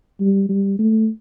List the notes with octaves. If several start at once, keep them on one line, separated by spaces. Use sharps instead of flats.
G3
G3
A3